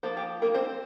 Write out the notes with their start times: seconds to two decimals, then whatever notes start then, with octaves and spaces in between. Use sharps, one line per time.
0.03 F3 A#3 C5
0.17 G4
0.42 A#3 A#4
0.54 C4 C5